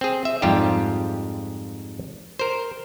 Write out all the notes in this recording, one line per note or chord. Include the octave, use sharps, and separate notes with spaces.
C4 G#4
E5
F2 G#2 G3 F4 G4
A#4 C5